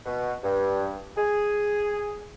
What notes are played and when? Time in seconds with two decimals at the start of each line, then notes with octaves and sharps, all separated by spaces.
0.06 B2
0.44 G2
1.17 G#4